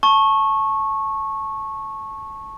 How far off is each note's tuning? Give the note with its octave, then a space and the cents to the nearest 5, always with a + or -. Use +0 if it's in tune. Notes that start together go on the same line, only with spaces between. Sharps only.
A5 +0 C#6 -15